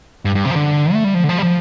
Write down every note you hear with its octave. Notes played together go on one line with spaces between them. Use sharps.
G2
G2
C3
F3
D3
A3
G3
F3
D3
F3
G3
F3